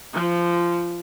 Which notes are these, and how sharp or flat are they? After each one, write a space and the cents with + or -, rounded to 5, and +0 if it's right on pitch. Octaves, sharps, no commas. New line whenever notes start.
F3 -15